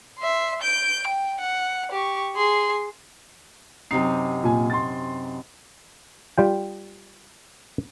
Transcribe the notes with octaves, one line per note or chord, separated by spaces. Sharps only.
E5 C6
G6 D7
G5
F#5
G4 C#6
G#4 C6
F#2 C3 D#4 C7
A#2 G#5
C6 A6
G3 F4 G5